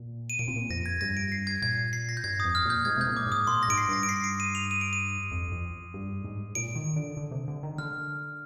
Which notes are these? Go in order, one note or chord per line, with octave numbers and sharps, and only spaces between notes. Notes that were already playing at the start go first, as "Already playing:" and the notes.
Already playing: A#2
D#7
A#2 D7
C3
A#2
F2 A#6
G#6
G2 A#6
D7
C7
G#6
A#2 G#6
C7
A#6
G6
G2 G#6
D#6
F2
F6
A#2 G6
G#2 G#6
C3 G6
A#2
D6
G#2
D#6
A#2 C6
A#6
G#2 D7
C7
G2 A#6
D7
C7
D7
D#7
F7
D#7
D7
D#7
F2
F2
G2
G#2
A#2 D7
D#3
D3
D3
C3
D3
D#3
D3 F6